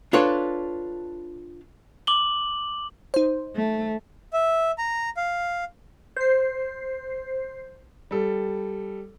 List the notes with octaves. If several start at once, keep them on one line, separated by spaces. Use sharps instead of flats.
D4 F4 A4 B4 C#5
D6 F#7 G7
D#4 C5
A3
E5
A#5
F5
C5 C7
G3 A4